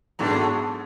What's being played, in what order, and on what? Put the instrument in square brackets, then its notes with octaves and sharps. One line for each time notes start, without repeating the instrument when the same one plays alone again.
[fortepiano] G#2 G#3 B3 D4 G#4 [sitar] F#3 A3